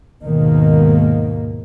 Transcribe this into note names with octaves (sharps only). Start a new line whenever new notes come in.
D#2 G#2 B2 D#3 A#3